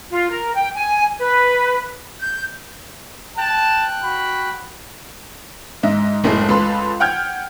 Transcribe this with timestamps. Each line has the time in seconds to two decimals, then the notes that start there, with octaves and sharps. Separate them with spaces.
0.10 F4
0.30 A#4
0.54 G5
0.75 G#5
1.18 B4
2.20 G6
3.38 G5 A5 F#6
4.03 F#4 B5
5.83 G#2 D#5 E5
6.24 F#1 B1 A2 G#3 A3 C7
6.49 C#2 A4 B4 B5 C6
7.00 F#5 G5 F6 G6 G#6